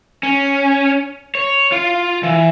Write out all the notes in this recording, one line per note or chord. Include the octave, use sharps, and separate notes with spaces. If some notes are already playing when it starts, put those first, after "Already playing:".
C#4
C#5
F4
E3